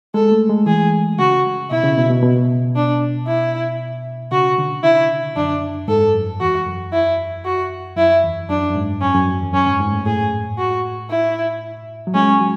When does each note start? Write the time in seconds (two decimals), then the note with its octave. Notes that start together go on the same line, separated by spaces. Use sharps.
0.14 G#3 A4
0.32 A3
0.50 G#3
0.66 E3 G#4
1.19 C#3 F#4
1.71 B2 E4
1.84 C#3
1.98 B2
2.10 B2
2.23 B2
2.76 D4
3.27 E4
4.31 C#3 F#4
4.58 D3
4.83 D3 E4
5.36 F#2 D4
5.88 G#2 A4
6.14 F#2
6.41 E2 F#4
6.66 F#2
6.93 E4
7.45 F#4
7.97 F#2 E4
8.24 E2
8.49 F#2 D4
8.70 F#2
8.75 G#2
9.01 F#2 C#4
9.15 F#2
9.27 F#2
9.40 E2
9.53 F#2 C#4
9.67 G#2
9.80 G#2
9.92 A2
10.06 A2 G#4
10.58 F#4
11.10 E4
12.07 F#3
12.14 G#3 C#4
12.40 F#3